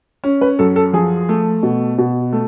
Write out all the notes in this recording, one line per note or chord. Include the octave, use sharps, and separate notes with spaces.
C#4
B4
F#2 A4
A4
F3 G#4
A3
B2
B2
A3